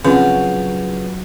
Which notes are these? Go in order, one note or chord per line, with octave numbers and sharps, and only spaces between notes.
C#3 F#3 C4 C#4 F4 B4 G6